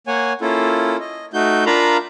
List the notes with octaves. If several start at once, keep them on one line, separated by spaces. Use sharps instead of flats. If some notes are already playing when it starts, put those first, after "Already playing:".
A#3 C#5 F#5 G#5
A#3 C#4 E4 F4 A4
D#5
A3 D#4 F#4 G6
D4 F4 A#4 F5 A#5 B5